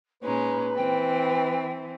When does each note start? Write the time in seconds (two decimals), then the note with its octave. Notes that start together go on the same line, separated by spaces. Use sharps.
0.23 A#2 G#3 C#4 D#4 B4
0.76 E3 C4 G5